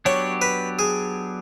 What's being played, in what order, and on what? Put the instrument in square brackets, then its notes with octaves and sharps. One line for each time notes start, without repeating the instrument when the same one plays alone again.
[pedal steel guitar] F#3 B3 D4 G4 [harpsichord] C#5
[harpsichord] B4
G#4